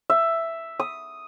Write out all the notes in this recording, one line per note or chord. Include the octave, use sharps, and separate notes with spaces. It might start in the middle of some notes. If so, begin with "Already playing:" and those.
E5
D#6